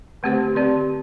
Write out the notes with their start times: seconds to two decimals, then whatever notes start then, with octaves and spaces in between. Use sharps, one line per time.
0.23 D3 A3 C4 G4 C5
0.56 D3 C4 G4 D5